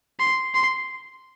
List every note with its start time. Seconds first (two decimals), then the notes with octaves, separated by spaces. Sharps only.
0.20 C6
0.55 C6